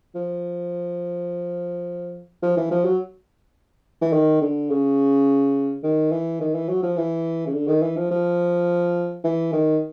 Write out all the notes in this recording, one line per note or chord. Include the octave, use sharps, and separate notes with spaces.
F3
F3
E3
F3
F#3
E3
D#3
D3
C#3
D#3
E3
D#3
E3
F#3
F3
E3
C#3
D3
D#3
E3
F3
F3
E3
D#3